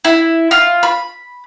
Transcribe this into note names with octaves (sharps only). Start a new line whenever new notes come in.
E4
F4
B5